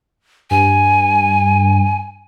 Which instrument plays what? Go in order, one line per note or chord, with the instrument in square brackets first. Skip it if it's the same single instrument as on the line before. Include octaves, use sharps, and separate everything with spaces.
[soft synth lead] G2 [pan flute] G#5